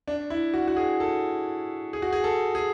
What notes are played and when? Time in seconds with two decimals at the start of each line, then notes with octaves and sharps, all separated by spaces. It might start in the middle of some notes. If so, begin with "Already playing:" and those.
0.08 D4
0.30 E4
0.54 F#4
0.68 F#4
0.77 G#4
1.00 A4
1.93 G#4
2.02 F#4
2.13 G#4
2.24 A4
2.55 G#4